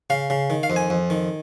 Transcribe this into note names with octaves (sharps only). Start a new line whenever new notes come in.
C#3 F5
C#3
D#3
F5
F2
G#5
F2
D#3